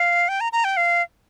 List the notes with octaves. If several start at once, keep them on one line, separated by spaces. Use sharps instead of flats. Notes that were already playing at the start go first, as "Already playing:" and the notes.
Already playing: F5
G5
A#5
A#5
G5
F5